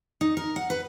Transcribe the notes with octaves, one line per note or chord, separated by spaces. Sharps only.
D#4
A#4
F#5
B4